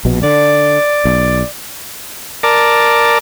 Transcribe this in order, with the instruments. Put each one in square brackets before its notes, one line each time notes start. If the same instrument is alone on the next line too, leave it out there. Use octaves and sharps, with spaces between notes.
[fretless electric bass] A#1 B2
[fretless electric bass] D3 [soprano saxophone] D5
[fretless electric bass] B1
[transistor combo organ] A#4 D5 A5